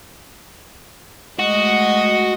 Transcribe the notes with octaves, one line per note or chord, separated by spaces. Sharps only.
G#3 A3 F#4 D#5